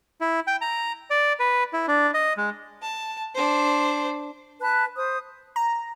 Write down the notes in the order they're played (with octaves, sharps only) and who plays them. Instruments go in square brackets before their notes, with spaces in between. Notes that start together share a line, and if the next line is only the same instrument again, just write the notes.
[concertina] E4
G5
A#5
D5
B4
E4
D4
D#5
G#3
[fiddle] A5
D4 C5
[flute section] B4 A5 F#6
C5 D#6
[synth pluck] A#5